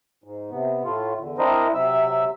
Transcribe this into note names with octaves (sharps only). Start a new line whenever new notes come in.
G#2
C3 B3
A2 A3 F4
E2 D3
C4 D4 E4 A#4 C5 D#5
C3 F#3 C4 E5 E6